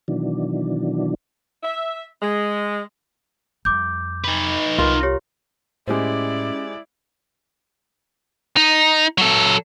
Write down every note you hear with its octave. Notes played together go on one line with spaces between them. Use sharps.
B2 D#3 E3 F#3 D4
E5
G#3
F2 G3 D6 G6
D#4 B4
C2 C4 F4 A#4
G4 C#5
A2 G#3 C#4 E4 G4 C5 D5
D#4
F#3 A4